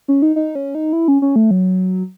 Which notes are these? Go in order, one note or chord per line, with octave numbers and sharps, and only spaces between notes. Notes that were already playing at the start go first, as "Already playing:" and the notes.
C#4
D#4
D#4
C#4
D#4
E4
C#4
C#4
A3
F#3